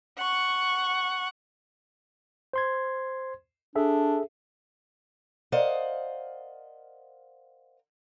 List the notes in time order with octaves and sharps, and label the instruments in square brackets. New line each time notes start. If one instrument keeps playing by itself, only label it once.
[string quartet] F#5 C#6
[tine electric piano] C5 C6 G#6
[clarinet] D4 [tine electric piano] G#4 A4 E5
[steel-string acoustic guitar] A#4 C5 D5 D#5 F5 F#5